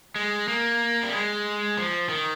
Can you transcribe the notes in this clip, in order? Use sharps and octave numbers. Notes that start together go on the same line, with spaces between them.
G#3
A#3
G3
G#3
F3
D#3